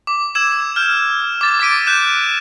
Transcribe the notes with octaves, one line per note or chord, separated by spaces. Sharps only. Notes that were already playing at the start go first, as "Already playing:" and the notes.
D6
E6 G#6 E7
F6 G6
D6 A6
D6 A6 B6 D7 D#7
F#6 G6 E7